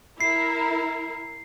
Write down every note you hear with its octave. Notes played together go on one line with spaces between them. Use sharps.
E4 A#4 C7